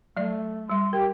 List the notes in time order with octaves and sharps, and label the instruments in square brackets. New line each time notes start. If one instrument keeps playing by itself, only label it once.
[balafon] F#3 D5 [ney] A3
[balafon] G3 E5 [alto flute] C6
[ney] G4 [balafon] A#4 [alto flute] G5